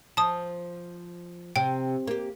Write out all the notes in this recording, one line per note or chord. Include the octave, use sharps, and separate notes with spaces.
F3 A5 D#6
C3 G5
A#3 G4